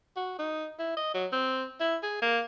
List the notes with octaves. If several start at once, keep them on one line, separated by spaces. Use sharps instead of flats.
F#4
D#4
E4
D#5
F#3
C4
E4
G#4
A#3